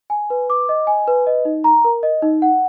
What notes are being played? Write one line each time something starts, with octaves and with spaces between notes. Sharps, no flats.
G#5
B4
D6
D#5
G#5
B4
D#5
D#4
A#5
A#4
D#5
D#4
F#5